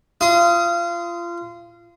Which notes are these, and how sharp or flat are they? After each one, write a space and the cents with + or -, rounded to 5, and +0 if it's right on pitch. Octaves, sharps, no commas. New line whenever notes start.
F4 -25 D#6 +20